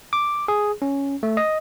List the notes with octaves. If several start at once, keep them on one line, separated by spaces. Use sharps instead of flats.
D6
G#4
C#4
A3
D#5